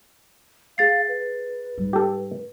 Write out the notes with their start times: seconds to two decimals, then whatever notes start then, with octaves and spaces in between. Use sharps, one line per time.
0.78 G#4 F5 A6 C7
1.09 B4
1.78 G#2 G3
1.93 G4 A4